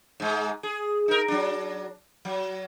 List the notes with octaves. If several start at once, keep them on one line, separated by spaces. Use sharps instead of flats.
G#2 G#3
G#4
D#4 A#4
F#3 D4
F#3